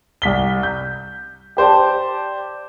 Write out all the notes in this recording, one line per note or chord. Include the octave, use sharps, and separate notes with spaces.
C2 B6 G7
G6
G4 C5 D5 A5